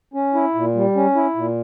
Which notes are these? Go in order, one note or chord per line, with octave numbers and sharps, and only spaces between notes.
C#4
E4
A#2
G3
C#4
E4
A#2